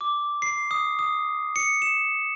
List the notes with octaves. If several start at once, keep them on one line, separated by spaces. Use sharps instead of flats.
D6
C7
D#6
D#6
C#7
E7